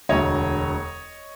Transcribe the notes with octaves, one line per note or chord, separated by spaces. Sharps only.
E1 D2 D3 C#5 D#5